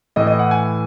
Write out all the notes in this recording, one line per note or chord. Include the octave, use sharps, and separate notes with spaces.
A2 E3 D#5
D#5
F#5
G#5